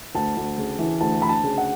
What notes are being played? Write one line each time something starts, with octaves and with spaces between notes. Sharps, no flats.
D2 A5
D2
C#3
E3
D2 A5
D2 B5
A5
C#3
F#5